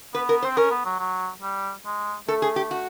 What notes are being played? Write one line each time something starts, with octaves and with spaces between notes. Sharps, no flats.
B3 B4
A#4
C5
C4
C#4 A#4
B3
F#3
F#3
G3
G#3
A3 A4
G#4
G4
F#4